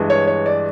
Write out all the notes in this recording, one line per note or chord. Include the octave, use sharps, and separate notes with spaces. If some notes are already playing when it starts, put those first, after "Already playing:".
Already playing: G2 E3 G#3
C#5
C#5
D5